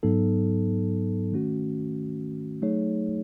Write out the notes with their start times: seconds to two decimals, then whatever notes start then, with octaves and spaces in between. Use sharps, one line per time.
0.03 G#2 F#3 B3 D#4 A4
1.32 D#3 A3 C#4 F#4
2.62 F#3 A3 D#4 G#4 C#5